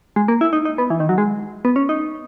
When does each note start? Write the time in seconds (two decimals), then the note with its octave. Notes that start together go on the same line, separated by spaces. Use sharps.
0.16 G#3
0.28 A#3
0.41 E4
0.53 D#4
0.65 D#4
0.78 B3
0.90 E3
1.00 D#3
1.09 F#3
1.18 G#3
1.65 B3
1.76 C#4
1.89 D#4